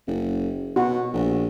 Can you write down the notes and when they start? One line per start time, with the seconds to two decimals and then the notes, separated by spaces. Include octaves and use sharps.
0.07 F#1
0.76 B2 F#4
1.13 A#1